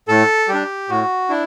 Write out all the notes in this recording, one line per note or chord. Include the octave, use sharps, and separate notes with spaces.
A2 A4
G3 G4
D4
A2 F#4
D4 E4